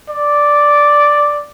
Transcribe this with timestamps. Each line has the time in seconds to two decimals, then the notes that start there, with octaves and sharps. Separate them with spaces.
0.09 D5